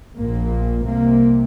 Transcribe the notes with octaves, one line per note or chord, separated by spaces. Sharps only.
A#1 A#2 A#3
C2 C3 A#3